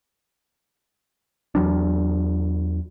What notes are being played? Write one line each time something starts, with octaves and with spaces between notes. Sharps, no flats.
E2 F#3 D4